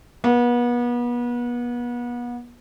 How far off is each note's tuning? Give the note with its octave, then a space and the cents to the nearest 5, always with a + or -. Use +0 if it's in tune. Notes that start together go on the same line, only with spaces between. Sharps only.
B3 -35